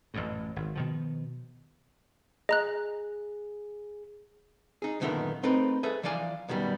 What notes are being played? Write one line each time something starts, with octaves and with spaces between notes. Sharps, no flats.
A1 F#2 A2
G#1
B2 D#3 F3
G#4 D#5 A#5 F#6
D#4 G#4
F#2 A#2 D3 D#3 B3 E5
A3 C4 D#4 A#4 B4
G#4 A4 B4 E5
E3 F3 D5 F5 G#5
F#2 B2 D#3 G3 B3